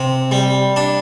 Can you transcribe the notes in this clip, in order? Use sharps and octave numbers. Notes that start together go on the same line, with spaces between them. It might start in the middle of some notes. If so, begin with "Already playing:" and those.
Already playing: C3
G3
D4